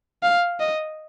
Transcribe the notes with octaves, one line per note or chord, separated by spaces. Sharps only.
F5
D#5